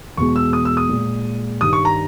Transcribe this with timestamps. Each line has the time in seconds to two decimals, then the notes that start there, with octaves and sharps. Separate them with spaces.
0.17 E2 B2 G#3 C#6
0.36 E6
0.53 D#6
0.65 E6
0.77 D#6
0.89 A#2 G#3
1.61 G2 D#3 G3 D#6
1.73 C#6
1.85 A#5